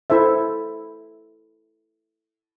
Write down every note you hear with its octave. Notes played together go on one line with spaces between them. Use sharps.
E4 A4 C5 E5